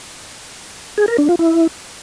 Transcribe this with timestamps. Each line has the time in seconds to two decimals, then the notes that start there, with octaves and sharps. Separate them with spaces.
0.98 G#4
1.08 A#4
1.18 D4
1.29 F4
1.39 E4